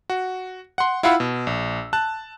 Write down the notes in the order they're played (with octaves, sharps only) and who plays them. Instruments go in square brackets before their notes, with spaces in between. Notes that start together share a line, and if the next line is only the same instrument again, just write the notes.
[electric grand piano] F#4
F#5 C6
E4 F4 F5 F#5 B5 E6
B2
A#1
A5 F#6